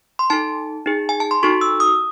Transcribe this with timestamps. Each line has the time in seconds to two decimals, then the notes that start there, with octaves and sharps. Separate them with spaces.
0.19 C6
0.30 D#4 A4 A5
0.86 D#4 G#4
1.09 G#5
1.20 A5
1.31 C6
1.43 D#4 F#4 A4 C#6
1.61 E6
1.80 D#6